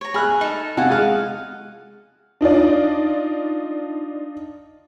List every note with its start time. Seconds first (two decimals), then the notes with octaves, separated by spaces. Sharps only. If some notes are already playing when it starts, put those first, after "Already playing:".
0.01 C#5 A#5
0.14 G#4 B5 F6 F#6
0.41 D#4 A4
0.77 C3 F4 F#4 A4 F#5 G#5
0.90 G#3 F5 D#6 F#6
2.41 D4 D#4 F4 D5